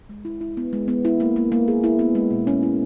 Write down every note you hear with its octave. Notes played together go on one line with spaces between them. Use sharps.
G#3
E4
E4
B3
G#3
B3
E4
A#3
A#3
A#3
G#4
E4
B3
G#3
B2
C#4
E4